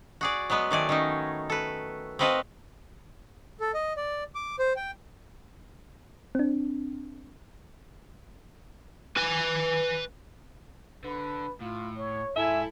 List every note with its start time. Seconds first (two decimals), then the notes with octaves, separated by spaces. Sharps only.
0.21 F#4 G#4 D5
0.50 F#3 G#3 B3 B4
0.71 D#3 A3 D5 G#5
0.89 D#3 C#4 D#4
1.50 A4 B4
2.19 C4 F#4 B4 D#5 F5 A5
3.60 A4
3.74 D#5
3.97 D5
4.35 D6
4.59 C5
4.76 G5
6.35 C4 D4
9.17 B4 G#5
11.04 D3 B4
11.61 A2 F4
11.97 C#5
12.36 G#2 E4 A4 E5 G#5